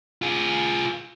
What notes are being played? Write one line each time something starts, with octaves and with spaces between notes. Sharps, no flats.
F4 G#4